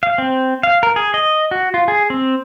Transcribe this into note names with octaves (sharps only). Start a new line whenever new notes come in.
F5
C4
F5
A#4
G#4
D#5
F#4
F4
G#4
C4